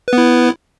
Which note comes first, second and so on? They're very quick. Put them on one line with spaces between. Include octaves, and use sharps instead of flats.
B4 B3 E4